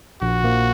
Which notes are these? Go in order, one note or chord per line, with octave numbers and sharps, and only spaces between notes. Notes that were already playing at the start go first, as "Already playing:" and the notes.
A#1 F#4
A#2 F3 A#3